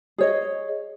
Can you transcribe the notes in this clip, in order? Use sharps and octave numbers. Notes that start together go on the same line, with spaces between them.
G#4 C#5 D#5